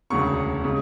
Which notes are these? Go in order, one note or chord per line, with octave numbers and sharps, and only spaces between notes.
E1 D2 C#3 C#6
C#3 G#3